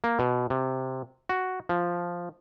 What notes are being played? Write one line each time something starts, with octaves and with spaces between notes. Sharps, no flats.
A#3
B2
C3
F#4
F3